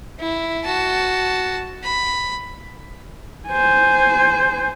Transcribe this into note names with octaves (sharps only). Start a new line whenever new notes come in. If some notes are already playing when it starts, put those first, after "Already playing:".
E4
F#4 A5
B5
C5 G#5